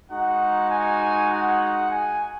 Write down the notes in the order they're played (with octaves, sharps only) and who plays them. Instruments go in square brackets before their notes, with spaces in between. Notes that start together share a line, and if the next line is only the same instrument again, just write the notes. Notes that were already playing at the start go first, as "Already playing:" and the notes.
[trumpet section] G#3 D#4 F#4 F#5
G#5
F#5
G#5